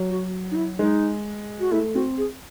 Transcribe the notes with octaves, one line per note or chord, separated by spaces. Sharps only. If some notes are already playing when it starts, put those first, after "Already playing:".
Already playing: F#3
F#4
D#4
E4
G#3 D#4
F#4
A3 E4
C4 F#4
G#4